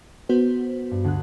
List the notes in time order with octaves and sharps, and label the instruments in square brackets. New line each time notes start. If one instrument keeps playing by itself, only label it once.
[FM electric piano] B3 F#4 C5 [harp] G6
[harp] G2
D2 F#6